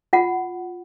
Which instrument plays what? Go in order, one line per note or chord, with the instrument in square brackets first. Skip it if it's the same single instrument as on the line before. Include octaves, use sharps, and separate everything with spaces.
[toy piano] F4 F#5